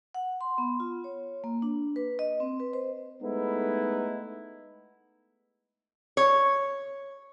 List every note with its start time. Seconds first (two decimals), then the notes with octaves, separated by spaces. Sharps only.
0.15 F#5
0.41 C6
0.58 B3
0.80 F4
1.04 C#5
1.44 A#3
1.62 D4
1.96 B4
2.19 D#5
2.40 C4
2.60 B4
2.73 C5
3.22 G#3 A3 B3 D#4 E4
6.17 C#5